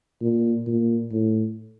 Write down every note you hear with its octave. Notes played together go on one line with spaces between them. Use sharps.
A#2
A#2
A2